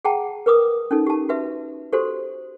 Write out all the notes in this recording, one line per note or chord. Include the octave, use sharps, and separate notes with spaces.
G#4 F#5 G5 A5 A#5
A#4 B4 D6 D#6
C#4 D#4 A4
G4 A5
F#4 B4 E5
F#4 G4 A4 C5 C6